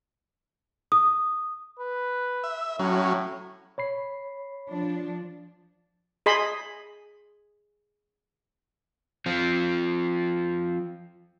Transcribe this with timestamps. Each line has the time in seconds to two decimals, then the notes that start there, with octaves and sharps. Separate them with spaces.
0.92 D#6
1.79 B4
2.44 E5
2.79 A2 F#3 C#4
3.78 C#5 B5 C7
4.68 F3 D4
6.26 G#4 D#5 B5 C6
9.26 F3 C4